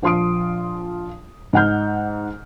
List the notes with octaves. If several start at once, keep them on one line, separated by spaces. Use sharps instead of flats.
A#1 F3 F4 C6 D#6 D7
G#2 D#5 F#5 F6 G6